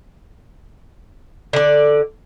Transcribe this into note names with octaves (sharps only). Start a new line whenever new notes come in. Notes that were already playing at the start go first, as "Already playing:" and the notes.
D3 D5